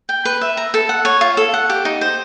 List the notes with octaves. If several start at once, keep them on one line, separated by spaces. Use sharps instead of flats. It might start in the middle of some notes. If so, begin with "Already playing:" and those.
G5
B4
E5
A#5
A4
F#5
C#5
F4
A4
F#5
G4
D#4
C5